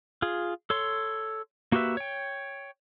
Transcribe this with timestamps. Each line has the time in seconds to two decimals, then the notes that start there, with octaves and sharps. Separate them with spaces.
0.22 F4 G#4
0.70 A4 C#5 C6
1.72 A#3 F#4 G4 B4 E5
1.97 C#5 G5